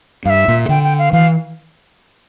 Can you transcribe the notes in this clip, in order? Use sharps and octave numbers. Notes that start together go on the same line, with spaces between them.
G2 E5 F5
A#2
D3 G5
G5
F5
E3 F5